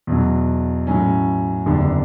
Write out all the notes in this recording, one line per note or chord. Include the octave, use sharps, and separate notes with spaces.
E2 B2 F#3
A2 F#3 C#4
F#1 E2 D3 G3 D4